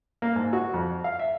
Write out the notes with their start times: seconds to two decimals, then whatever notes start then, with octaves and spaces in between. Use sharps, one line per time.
0.22 A#3
0.36 G#2
0.53 F#4
0.74 F2
1.04 F5
1.19 E5